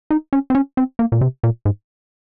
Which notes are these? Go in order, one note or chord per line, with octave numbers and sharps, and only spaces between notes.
D#4
C#4
C4
C#4
C4
A#3
A#2
C3
A#2
G#2